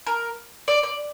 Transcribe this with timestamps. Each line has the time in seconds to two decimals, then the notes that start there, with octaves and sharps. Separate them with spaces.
0.07 A#4
0.68 D5
0.83 D5